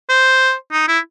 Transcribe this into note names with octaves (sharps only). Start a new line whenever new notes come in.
C5
D#4
E4